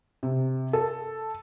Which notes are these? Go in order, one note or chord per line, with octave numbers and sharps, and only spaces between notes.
C3
A4